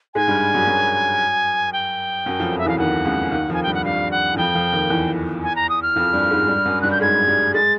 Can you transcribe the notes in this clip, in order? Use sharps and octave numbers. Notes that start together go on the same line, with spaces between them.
G#2 G#3 G#5
G2 G3
F#2 F#3
F#2 F#3
G5
F#2 F#3
F2 F3
F2 F3
E5
E2 E3 F5
D#2 D#3 F#5
C#2 C#3
D#2 D#3
F2 F3 G#5
G2 G3 G5
F#5
G2 G3 F5
F#5
E3
F2 F3 G5
F2 F3
D#2 D#3
E2 E3
G#5
A#5
D#6
F6
F2 F3
G2 G3
G#2 G#3
G2 G3
F#2 F#3
G2 G3 F#6
G6
G#2 G#3 G#6
G2 G3
G#3 A6